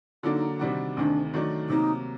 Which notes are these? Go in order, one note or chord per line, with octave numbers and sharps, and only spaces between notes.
D3 F#3 A#3 D4 D#4 F4 A4
C3 D#3 G3 D4 F#4
D2 C3 D#3 D4
D#3 F#3 A3 D4
C3 F#3 A#3 D#4